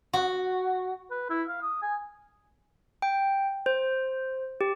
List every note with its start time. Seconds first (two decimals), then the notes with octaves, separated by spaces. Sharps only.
0.13 F#4
1.11 B4
1.30 E4
1.48 F5
1.62 D#6
1.82 G#5
3.02 G5
3.66 C5
4.61 G4